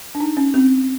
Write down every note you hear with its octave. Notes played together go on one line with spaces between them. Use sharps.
D4
D#4
C#4
C4